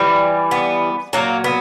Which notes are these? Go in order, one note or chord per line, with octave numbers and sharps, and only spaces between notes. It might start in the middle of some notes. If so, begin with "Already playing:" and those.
Already playing: E3 G3
B3
A#2 F#3 A#3
B3